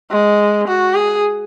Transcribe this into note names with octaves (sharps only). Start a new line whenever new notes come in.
G#3
F#4
G#4